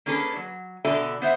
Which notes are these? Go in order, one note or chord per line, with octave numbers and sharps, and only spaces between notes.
A#3 C#4 D4 G#4 A4 B4
F#3
B2 D3 A4 D5 E5 G#5
B3 C5 E5 F#5